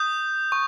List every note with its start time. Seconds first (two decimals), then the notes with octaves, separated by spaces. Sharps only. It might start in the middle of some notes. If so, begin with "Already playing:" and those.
Already playing: D#6 G6
0.52 C#6